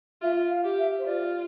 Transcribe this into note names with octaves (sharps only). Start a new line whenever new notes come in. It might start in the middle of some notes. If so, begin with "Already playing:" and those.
F4 E5
F5
G4
E5
C5
F4 D5